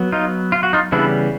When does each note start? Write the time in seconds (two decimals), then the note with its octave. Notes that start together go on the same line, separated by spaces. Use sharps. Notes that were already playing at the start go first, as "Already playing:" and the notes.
Already playing: F#3 B3
0.12 D#4 F4
0.52 F4
0.63 F#4
0.73 D#4 F4
0.92 C#3 E3 G3 B3 D4 E4